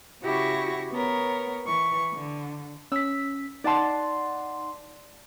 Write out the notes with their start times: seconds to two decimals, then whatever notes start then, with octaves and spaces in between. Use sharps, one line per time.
0.24 C#3 E4 F#4 G4 C#6 A#6
0.92 B3 A#4 C#5
1.66 E3 C#6
2.15 D3
2.92 C#4 E6 B6
3.64 D#4 D5 F#5 A5 C6